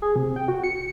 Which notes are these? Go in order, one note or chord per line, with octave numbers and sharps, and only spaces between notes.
G#4
C3
G5
F#4
C#7